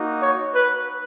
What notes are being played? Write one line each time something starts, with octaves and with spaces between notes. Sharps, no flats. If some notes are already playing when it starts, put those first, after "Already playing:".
Already playing: A#3 D#4 F#4
C#5
B4